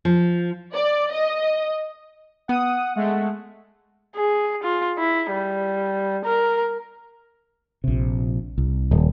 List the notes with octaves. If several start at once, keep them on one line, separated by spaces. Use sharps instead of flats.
F3
D5
D#5
B3 F#5 D#6
G#3 A3 F#5
G#4
F4
E4
G3
A#4
A#1 C3
C2
D#1